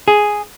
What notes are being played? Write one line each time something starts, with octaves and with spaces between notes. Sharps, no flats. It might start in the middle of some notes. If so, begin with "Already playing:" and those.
G#4